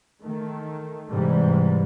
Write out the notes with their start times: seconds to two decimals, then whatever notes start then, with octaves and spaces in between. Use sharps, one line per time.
0.22 D#3 A3
1.10 G#2 C3 E3 G3